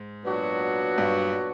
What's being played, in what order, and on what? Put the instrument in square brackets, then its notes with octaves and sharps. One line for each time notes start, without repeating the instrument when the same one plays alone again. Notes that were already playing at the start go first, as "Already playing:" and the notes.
Already playing: [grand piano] G#2
[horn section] A#2 F#3 B3 D4 F#4
[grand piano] G2